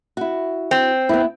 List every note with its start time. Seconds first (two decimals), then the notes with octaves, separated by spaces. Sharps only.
0.17 E4 F#4
0.71 C4
1.09 B3 E4